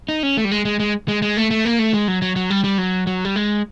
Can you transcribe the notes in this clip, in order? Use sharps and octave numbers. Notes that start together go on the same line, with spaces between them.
D#4
C#4
A3
G3
G#3
G#3
G#3
G#3
G#3
A3
A3
A#3
A3
G#3
F#3
F#3
F#3
G3
G3
F#3
F#3
G3
G#3